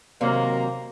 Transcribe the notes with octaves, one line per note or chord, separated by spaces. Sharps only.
D#2 C3 F#3 A#3